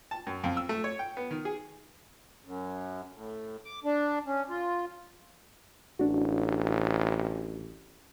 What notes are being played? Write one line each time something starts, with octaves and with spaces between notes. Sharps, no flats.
A5
F#2
F2
E6
A3
C#5
G5
B3
D#3
G#4
F#2
A2
D6
D4
C#4
F4
A1 D4 F#4